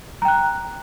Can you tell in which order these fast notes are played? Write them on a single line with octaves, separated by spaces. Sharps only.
A#5 G5 F#6